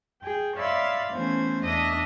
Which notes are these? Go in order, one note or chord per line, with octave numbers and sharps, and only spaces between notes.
G#4 G5
C#5 D5 E5 F5 B5 C6
E3 A3 B3 C#4 C5 G#6
E2 D4 D#5 E5 D#6